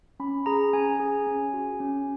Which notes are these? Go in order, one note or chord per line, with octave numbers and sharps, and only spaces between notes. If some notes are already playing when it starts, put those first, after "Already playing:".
C#4 B5
G#4 A#5
C#4 G#5
G#4
C#4
F#4
C#4